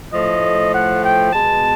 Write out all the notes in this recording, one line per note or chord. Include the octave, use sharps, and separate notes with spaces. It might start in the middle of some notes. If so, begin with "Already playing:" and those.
A2 F3 A3 D#5
F#5
G5
B2 G#3 B3 A5